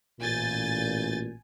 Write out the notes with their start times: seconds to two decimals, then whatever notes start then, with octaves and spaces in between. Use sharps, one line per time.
0.20 A1 A#2 G#5 G6 A6